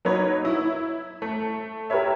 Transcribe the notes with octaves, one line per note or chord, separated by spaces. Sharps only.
F#3 A#3 D#4 F#4 B4 C#5
E4
A3
G4 A#4 B4 C#5 E5